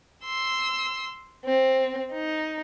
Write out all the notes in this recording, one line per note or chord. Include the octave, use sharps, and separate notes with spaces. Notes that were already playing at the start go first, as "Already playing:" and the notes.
C6 E6
C4
D#4